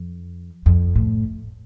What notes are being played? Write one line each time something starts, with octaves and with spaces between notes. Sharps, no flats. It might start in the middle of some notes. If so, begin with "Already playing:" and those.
Already playing: F2
F2
A2